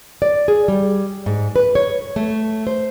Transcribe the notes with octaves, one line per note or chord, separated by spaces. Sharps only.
D5
G#4
G3
G#2
B4
C#5
A3
C5